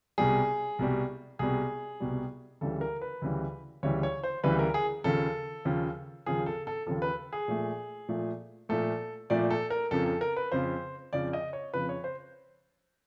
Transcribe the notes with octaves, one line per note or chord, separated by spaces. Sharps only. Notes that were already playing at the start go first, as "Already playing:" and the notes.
C2 B2 G3 G#4
C2 B2 G3
C2 B2 G3 G#4
C2 B2 G3
D2 C#3 E3 G3 A4
A#4
B4
D2 C#3 E3 G3
D2 C#3 E3 G3 C#5
C#5
C5
D2 C#3 E3 G3 B4
A#4
G#4
D#2 C#3 F3 A4
D#2 C#3 F3
D#2 C#3 F3 G#4
A4
A4
D#2 C#3 F3 A4
B4
G#4
A#2 F3 A3
A#2 F3 A3
A#2 F3 A3 A4
A#2 F3 A3 D5
A4
A#4
F2 C#3 F3 A4
A4
A#4
B4
F2 C#3 F3 C5
F2 C#3 F3 D5
D#5
C#5
F2 C#3 F3 B4
C#5
C5